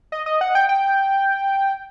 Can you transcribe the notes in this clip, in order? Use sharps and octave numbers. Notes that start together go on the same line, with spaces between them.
D#5
D#5
F#5
G5
G5